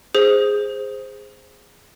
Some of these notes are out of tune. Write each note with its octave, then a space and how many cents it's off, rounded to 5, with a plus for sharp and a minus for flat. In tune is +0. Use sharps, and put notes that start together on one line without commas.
G#4 -10 C5 +0